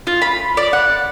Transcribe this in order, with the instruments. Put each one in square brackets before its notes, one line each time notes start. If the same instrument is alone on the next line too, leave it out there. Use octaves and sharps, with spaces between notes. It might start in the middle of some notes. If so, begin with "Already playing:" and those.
[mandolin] F4
B5
D5
F#5